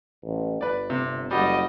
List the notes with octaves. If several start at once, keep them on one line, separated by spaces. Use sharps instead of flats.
A1
G1 B4 D5
C3
F#1 G3 F#4 G4 D#5